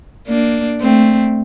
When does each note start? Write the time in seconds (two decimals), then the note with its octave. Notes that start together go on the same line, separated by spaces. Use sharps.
0.28 A#3 D4
0.80 A3 C4